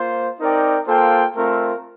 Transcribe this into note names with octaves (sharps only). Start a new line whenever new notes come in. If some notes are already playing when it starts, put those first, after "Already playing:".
Already playing: A#3 F4 C5
C4 D#4 A#4 D5 G5
A#3 F4 A4 C5 G5
A3 C4 F4 A#4